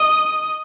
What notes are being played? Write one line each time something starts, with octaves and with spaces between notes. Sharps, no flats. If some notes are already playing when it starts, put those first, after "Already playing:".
Already playing: D#5